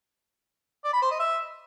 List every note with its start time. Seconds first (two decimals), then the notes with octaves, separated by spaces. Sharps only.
0.84 D5
0.93 B5
1.02 C5
1.11 D#5
1.19 E5